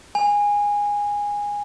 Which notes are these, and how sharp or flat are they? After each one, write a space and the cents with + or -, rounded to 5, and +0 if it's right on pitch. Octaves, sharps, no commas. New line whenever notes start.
G#5 -15